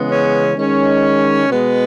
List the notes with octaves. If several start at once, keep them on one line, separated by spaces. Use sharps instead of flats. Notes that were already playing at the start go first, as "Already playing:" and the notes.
Already playing: C#3 E3 G#3 B3
C#4
D#3 G#3 C#4
B2 G#3 B3